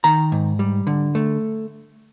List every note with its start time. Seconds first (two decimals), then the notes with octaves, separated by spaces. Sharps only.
0.04 D#3 A#5
0.32 G#2
0.59 G3
0.87 D3
1.15 A3